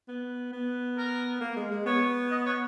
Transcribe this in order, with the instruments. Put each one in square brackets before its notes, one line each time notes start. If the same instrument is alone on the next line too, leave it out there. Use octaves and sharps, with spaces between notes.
[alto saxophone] B3
B3
[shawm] A#4
[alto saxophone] A#3
G#3
G#3
[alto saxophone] B3 [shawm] C#5
[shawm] D#5
C#5